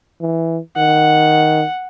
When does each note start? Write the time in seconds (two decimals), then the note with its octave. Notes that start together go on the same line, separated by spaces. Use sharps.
0.21 E3
0.77 D#3 F#5